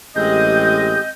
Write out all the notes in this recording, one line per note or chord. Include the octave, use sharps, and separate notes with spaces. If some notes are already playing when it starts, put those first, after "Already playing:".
A1 G#3 C4 G4 G#4 D#5 D#6 G6